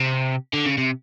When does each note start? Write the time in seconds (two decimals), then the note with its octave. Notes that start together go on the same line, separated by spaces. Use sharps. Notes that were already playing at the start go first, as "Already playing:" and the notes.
Already playing: C3
0.53 D3
0.66 C#3
0.78 C3